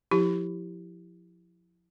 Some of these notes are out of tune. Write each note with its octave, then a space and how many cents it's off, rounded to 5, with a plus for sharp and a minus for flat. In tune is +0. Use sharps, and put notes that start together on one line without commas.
F3 +20 E4 +0 G4 +0